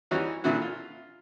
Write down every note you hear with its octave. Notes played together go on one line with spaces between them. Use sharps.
E3 G3 C#4 D#4 F#4
A#2 D3 E3 E4 F#4
F4